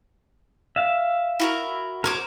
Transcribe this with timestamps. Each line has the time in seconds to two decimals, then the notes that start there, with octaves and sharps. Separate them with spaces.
0.76 E5 F5
1.40 E4 F#4 A#4
2.04 F#4 A#4 C5 C#5 D6